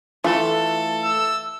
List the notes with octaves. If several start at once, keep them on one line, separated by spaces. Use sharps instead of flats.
E3 A3 F4 A4
E6